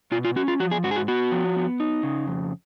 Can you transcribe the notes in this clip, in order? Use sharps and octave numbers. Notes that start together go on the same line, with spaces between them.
B2 F4
F4
C#4 F#4
F4
F3 F#4
G#4
G#2 F#4
G#4
F#4
B3 F#4
F3
B3
D#4
C#3
F2